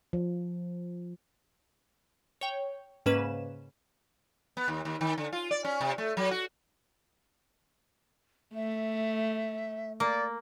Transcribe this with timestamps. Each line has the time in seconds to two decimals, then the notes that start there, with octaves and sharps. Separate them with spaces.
0.13 F3
2.41 C#5 G5
3.06 G#2 C#3 A#3 C#4 B4 E7
4.57 B3
4.68 D#2
4.85 D#2
5.01 D#3
5.18 D3
5.33 F4
5.51 D5
5.65 C#4
5.81 C3
5.98 A3
6.17 F#3
6.31 F#4
8.55 A3 E5
10.00 A#3 D5